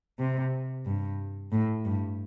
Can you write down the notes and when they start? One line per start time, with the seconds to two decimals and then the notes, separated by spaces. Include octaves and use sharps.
0.19 C3
0.86 G2
1.52 A2
1.85 G2